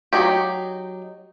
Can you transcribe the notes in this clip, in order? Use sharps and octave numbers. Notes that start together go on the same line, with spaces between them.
F#3 D#4 G4